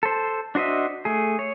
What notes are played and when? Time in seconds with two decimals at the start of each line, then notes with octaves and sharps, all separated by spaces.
0.03 A4 C5
0.55 D4 F#4 C5 D#5 E5
1.05 A3 G#4
1.39 C#5